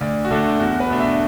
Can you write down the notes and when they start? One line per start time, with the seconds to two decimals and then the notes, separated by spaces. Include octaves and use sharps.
0.01 D2 D5
0.25 F#4
0.31 D3 A3 D4 A4
0.60 E2 F#4
0.80 B4
0.90 B2 A3 D4
1.00 E5